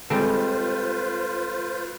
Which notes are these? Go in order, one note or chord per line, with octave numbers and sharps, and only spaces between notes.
G3 G#3 C4 F4 A4 B4 C5